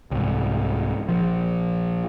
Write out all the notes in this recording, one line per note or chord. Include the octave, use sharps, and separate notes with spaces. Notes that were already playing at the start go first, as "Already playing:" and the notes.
C2 G#2
A#1 F3